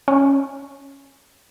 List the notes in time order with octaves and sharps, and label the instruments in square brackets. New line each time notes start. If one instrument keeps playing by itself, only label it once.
[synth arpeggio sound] C#4